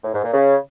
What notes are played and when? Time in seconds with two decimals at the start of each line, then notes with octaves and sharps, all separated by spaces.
0.04 A2
0.14 G#2
0.24 A#2
0.34 C#3